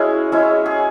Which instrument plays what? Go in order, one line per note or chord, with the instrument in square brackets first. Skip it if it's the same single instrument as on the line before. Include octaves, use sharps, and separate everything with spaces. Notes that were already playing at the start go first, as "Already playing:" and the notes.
Already playing: [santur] G#3 C#4 E4 F#4 G#4
G#3 C#4 E4
G#4